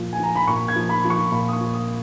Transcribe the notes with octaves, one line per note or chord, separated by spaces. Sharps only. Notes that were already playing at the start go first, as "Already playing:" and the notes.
Already playing: A#2 F3
G#5
F3 A#5
B5
A#2 C#6
G#6
F3
B5
F3
C#6
A#2 B5
D#6
C#6
F3
D#6